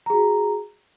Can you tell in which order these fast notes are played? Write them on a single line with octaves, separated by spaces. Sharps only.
A#5 G#4 F#4